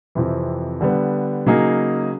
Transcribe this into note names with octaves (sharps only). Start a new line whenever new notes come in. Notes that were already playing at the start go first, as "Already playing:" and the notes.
F2 C3 E3
D3 G3 B3
C#3 F#3 A#3 D#4 G#4